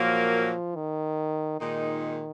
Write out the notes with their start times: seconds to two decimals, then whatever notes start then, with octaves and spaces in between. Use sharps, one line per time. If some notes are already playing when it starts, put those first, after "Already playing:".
Already playing: A#2 F3 F#3 A#3
0.76 D#3
1.59 A#2 D#3 G#3 D#4